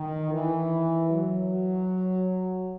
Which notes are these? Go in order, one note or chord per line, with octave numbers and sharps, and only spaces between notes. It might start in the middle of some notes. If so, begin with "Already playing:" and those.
Already playing: D#3
E3
F#3